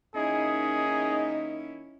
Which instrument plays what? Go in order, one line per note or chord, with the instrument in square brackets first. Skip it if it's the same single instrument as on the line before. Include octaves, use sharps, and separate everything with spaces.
[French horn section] D#3 A#3 D#4 [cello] C#4 E4 [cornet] G#4 [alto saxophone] D#5